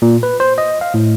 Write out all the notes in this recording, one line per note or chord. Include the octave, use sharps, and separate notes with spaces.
A#2
B4
C5
D#5
F5
A2